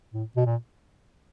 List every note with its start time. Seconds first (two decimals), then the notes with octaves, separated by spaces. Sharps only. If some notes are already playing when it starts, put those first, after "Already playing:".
0.14 A2
0.37 B2
0.46 A#2